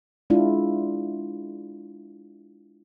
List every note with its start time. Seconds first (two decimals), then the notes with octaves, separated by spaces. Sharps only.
0.30 G#3 D4 E4 F4